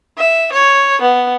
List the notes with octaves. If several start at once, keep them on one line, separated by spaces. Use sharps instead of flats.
E5
C#5
B3